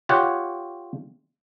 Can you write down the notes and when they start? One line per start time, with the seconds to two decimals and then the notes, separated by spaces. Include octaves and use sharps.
0.09 F4 G4 C#5 F#5